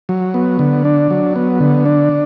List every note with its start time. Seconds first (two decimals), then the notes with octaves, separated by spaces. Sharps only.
0.09 F#3
0.34 B3
0.59 D3
0.85 D4
1.10 F#3
1.36 B3
1.60 D3
1.86 D4